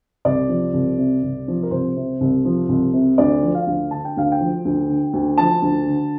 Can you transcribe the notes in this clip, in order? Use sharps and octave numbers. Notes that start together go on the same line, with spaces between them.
C2 D5
F3
C2
C3
C2
F3
A#4
C2 C5
C3
C2
F3
C2
C3
D2 D5
F3
F5
D2
D3 A5
G5
D2 F5
G5
F3
D2
D3
D2
F3 A5
D2
D3